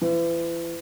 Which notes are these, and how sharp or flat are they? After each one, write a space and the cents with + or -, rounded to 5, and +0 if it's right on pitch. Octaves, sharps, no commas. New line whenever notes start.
E3 +35